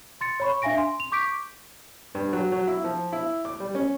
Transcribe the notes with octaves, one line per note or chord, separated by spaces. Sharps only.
C6 A6 C#7
C#5 B5 C#6
D4 E5 F5 G#5 A#6 D7
C6
F7
C#6 D6 G6 B6 D7
G2
F#3
F#3
E4
F3
E4
D6
G3
C#4